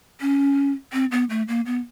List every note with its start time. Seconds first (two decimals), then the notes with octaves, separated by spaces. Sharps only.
0.21 C#4
0.93 C4
1.12 B3
1.30 A3
1.48 A#3
1.66 B3